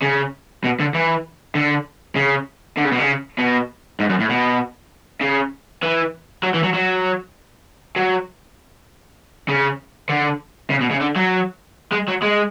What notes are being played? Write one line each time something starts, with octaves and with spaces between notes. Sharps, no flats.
C#3
B2
D3
E3
D3
C#3
D3
C#3
B2
C#3
B2
G#2
F#2
A2
B2
C#3
E3
F#3
E3
F#3
F#3
F#3
C#3
D3
C#3
B2
C#3
D3
F#3
G#3
F#3
G#3